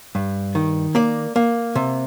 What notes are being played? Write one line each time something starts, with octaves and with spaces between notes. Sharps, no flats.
G2
D#3
A#3 D5
A#3
C3